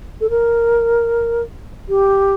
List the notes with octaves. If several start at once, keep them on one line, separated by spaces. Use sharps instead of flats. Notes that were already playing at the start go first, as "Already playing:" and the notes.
A4
A#4
G4